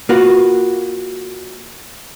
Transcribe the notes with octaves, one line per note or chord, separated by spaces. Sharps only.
A#3 F4 F#4 B4